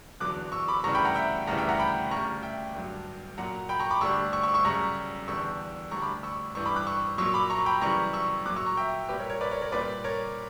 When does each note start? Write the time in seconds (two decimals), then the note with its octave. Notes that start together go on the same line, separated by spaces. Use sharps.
0.20 E2 D3 F#3 D6 F#6
0.52 C#6 E6
0.68 B5 D6
0.83 D2 C#3 E3 G3 A#5 C#6
0.95 G5 B5
1.05 F#5 A#5
1.15 E5 G5
1.47 D2 C#3 E3 G3 F#5 A#5
1.58 E5 G5
1.69 F#5 A#5
1.79 G5 B5
2.11 D2 C#3 G3 A#5 C#6
2.42 E5 G5
2.75 G2 D3 F#3
3.38 A#2 F#3 F#5 A#5
3.69 G5 B5
3.80 A#5 C#6
3.91 B5 D6
4.01 D2 D3 G3 C#6 E6
4.33 C#6 E6
4.43 C#6 E6
4.54 C#6 E6
4.65 F#2 C#3 G3 A#5 C#6
5.28 E2 D3 G3 C#6 E6
5.91 D2 D3 G3 A#5 C#6
6.02 B5 D6
6.23 C#6 E6
6.55 G2 E3 G3 C#6 E6
6.66 B5 D6
6.76 D6 F#6
6.87 C#6 E6
7.18 A#2 F#3 C#6 E6
7.34 B5 D6
7.50 A#5 C#6
7.66 G5 B5
7.82 F#2 C#3 E3 G3 A#5 C#6
8.13 C#6 E6
8.45 A#2 D6 F#6
8.49 F#3
8.56 C#6 E6
8.66 A#5 C#6
8.77 E5 G5
9.09 A#2 G3 G4 B4
9.19 A#4 C#5
9.30 A#4 C#5
9.41 B4 D5
9.51 A#4 C#5
9.62 A#4 C#5
9.72 A#2 G3 B4 D5
10.04 A#4 C#5